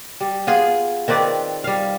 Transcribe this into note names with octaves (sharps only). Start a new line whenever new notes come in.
G3
B3 F4 G#4
D#3 C4 B4 D5
G3 F5